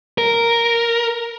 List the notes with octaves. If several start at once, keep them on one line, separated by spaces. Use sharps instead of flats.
A#4